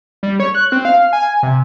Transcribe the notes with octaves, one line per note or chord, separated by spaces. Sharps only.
G3
C#5
F#6
C4
F5
G#5
C3